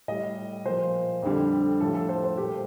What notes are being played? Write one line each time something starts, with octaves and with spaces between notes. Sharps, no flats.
A2 G3 D#5
A#2 F3 C5
F2 D3 G3
A2 F3 A4
A4
C5
C5
A#2 G3 G4